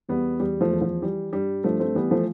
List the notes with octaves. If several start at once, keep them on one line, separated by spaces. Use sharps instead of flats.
E2 G3 B3
E2 G3
F3 A3
E2
F3
E3 G3
G2 G3
G2 F3 A3
A3 C4
E3 G3 B3
F3 A3